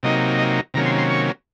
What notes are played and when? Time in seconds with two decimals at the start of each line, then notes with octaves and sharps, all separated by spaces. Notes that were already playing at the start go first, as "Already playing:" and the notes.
0.03 C3 F#3 A#3 D#4 D#5
0.39 D#5
0.74 C3 D#3 F#3 A#3 C#4 A#5
0.86 C6
0.98 C6
1.10 C#6